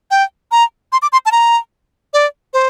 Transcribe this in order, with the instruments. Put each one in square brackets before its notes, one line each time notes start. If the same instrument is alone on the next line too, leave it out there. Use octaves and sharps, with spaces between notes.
[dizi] G5
A#5
C6
D6
C6
A5
A#5
D5
C5